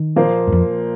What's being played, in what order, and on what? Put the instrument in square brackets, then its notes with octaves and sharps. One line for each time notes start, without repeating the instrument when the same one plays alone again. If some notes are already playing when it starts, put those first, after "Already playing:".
Already playing: [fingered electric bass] D#3
[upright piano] A#2 F3 A#3 F4 C5
[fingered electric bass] F#2
F2